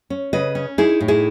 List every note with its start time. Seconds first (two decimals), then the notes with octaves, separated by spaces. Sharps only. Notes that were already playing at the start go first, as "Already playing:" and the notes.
0.10 C#4
0.33 C#3 B4 D#5
0.55 C#4
0.78 D#4 E4 G#4
1.00 A2
1.08 E4 G#4